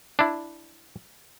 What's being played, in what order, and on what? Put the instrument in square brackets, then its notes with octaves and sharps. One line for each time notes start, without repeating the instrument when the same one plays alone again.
[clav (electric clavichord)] D4 E4